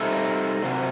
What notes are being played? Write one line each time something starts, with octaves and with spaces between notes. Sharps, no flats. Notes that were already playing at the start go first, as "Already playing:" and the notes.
Already playing: G3 C4 D#4 A4 E5
C3 F#3 C4